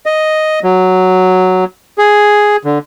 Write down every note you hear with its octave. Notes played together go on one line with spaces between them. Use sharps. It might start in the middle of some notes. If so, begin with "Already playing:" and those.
D#5
F#3
G#4
D3